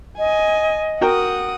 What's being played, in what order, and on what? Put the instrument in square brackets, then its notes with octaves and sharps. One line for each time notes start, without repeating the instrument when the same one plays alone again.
[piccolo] D#5 [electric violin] G#5
[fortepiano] F#4 A#4 G5 [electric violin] F#5 D#6